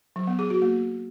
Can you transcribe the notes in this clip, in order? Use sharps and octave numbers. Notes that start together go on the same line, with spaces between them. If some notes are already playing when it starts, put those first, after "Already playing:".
F#3
B3
G#4
F#4
A#3